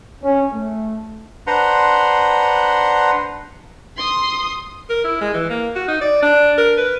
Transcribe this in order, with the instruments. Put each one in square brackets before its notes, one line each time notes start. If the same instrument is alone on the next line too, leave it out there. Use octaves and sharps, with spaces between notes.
[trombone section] C#4
A3
[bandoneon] D4 B4 C5 F#5 A#5 C6
[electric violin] C6 D#6
[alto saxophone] A#4
E4
G#3
E3
A#3
F#4
D#4
D5
D4
A#4
B4